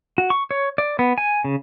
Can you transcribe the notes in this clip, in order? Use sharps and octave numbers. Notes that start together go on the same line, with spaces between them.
F#4
C#6
C#5
D5
B3
G#5
C#3